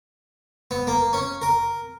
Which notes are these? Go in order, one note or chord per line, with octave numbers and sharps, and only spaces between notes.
B3
A#3
C#4
A#4